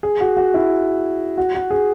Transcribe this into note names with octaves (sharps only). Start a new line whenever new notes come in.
G#4
F#4
F#4
E4
F#4
F#4
G#4